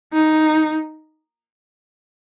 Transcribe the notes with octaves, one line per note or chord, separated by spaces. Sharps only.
D#4